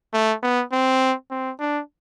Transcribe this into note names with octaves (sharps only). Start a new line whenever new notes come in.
A3
B3
C4
C4
D4